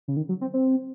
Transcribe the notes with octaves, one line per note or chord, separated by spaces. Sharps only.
C#3
D#3
F#3
C4
C4